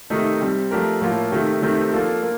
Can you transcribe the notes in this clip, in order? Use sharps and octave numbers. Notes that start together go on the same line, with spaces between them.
C3 D#3 A3 D#4
C3 G3 C4
F3 A3 D4 G4 A#4
A2 F3 A#3 F4
C3 D#3 A3
C3 D#3 A3 C4
F3 A#3 D4 F4 A4
A#3